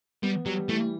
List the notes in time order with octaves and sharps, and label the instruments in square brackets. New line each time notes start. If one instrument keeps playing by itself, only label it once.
[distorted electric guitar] G3 [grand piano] B3
[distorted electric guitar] F#3 [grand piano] G3
[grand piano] E3 [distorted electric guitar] A3